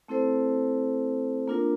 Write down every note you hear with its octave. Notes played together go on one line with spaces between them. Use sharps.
A3 C4 E4 A4 C5
A#3 D4 F4 A#4